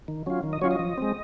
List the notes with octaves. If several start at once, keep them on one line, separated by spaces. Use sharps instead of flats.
D#3
F#3 C#4 F4
D#3
D#5
F#3 C#4 F4 C#5
D#5
F3
G#3 C4